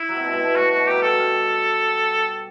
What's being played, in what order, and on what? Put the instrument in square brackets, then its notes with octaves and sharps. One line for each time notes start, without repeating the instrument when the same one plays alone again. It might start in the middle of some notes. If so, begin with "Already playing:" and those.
Already playing: [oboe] E4
[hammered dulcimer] F#3
C3
B2
A2
B2
[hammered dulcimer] A2 [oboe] F#4
[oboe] F#4
[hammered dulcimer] B2
[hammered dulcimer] F#3 [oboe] G4
[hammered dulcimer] G3 [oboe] A4
[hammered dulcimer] G3